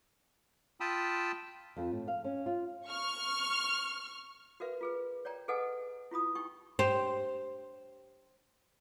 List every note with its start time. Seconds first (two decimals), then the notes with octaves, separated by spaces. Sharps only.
0.80 F4 G5 A5 B5 D#6 E6
1.77 F2
1.91 A2
2.08 F5
2.24 C#4
2.46 F4
2.86 C#6 F6
4.60 F#4 A#4 B4 E5
4.81 F4 G#4 B4
5.25 C#5 D5 G5 A#5
5.48 G#4 A4 B4 D#5 F#5 G#5
6.11 E4 F4 B5 D#6
6.35 D#4 G4 G5 C#6
6.79 G4 C5